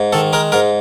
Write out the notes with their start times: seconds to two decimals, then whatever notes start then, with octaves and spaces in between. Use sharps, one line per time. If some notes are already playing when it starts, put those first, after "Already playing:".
Already playing: G#2
0.13 D#3 A4
0.33 G#3 A#4
0.52 G#2 A#4